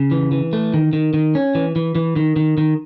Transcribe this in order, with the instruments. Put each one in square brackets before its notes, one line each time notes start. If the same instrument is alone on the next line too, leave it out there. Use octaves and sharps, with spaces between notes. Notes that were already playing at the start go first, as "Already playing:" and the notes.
Already playing: [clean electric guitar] C#3
E3
E3
A3
D#3
D#3
D#3
C#4
E3
E3
E3
D#3
D#3
D#3